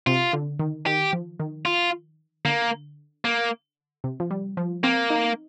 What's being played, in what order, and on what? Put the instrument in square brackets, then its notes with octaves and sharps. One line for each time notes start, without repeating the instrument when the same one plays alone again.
[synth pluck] C3 [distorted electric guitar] F4
[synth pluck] D3
D#3
[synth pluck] D#3 [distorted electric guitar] G4
[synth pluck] F3
D#3
[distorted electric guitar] F4
[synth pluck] D3 [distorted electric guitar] A#3
[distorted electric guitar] A#3
[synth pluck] C3
F3
G3
F3
[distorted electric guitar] A#3 [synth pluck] C4
[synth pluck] D#4